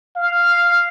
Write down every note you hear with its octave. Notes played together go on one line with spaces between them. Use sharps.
F5